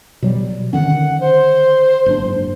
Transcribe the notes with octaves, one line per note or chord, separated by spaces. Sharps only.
B2 F#3 G3
D3 D#3 C#4 F#5
C5
F#1 G#2 D4